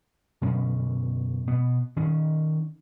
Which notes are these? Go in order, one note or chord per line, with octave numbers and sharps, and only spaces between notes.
F#2 B2 D3 C#4
B2 B3
D#3 C#4